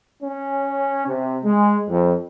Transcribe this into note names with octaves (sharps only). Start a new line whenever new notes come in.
C#4
C3
G#3
F2